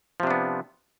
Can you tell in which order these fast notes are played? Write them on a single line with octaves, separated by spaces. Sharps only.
F3 C3 D4 B3